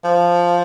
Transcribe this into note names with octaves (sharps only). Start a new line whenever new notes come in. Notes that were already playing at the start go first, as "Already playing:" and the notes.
F3